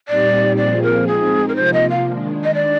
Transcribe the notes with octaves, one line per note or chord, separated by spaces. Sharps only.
A#2 G3 C4 D#4 G4 D5
A#2 F3 C4 F4 G#4 D5
A#4
G#3 C4 D#4 G#4
A#4
C3 F3 A#3 F4 C5
D#5
F5
D#3 G#3 D4
D#5
D5